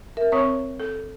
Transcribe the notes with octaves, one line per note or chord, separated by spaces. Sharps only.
A#4 E5
C4 C#5 C#6 D#6
A4